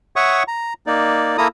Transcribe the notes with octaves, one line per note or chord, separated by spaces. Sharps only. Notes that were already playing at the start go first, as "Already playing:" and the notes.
C#5 E5 F#5 C#6 D#6
A#5
A#3 D#4 D5
A#3 E4 A4 A#5 D#6